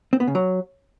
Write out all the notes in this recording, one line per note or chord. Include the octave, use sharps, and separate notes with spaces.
C4
B3
C#3
F#3